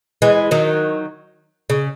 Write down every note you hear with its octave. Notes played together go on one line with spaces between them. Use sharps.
E3 G#3
D#3 F#3
C#3